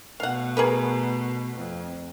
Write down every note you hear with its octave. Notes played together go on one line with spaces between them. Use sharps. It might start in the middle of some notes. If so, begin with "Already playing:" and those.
B2 A3 F5 F#5
G#4 A#4 B4
F2